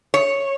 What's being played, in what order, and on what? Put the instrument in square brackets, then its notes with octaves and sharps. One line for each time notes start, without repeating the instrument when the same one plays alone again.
[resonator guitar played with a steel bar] C#5